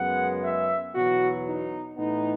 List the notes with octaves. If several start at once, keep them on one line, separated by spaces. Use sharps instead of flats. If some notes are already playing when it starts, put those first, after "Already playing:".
Already playing: F#2 C#3 G#3 B3 F#5
E5
E2 B2 F#3 B3 F#4
D#4
A2 E3 B3 D#4